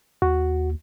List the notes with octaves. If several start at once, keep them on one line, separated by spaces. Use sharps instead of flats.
D#2 F#4